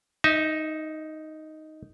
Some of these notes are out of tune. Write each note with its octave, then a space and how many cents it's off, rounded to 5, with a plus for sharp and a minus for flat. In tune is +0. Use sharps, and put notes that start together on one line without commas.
D#4 +0 E5 -25